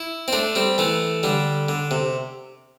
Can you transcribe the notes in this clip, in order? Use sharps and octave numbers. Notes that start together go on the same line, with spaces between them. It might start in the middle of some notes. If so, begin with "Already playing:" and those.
Already playing: E4
C4
A3 D4
G3 C4
E3 A3
D3 G3
D3
C3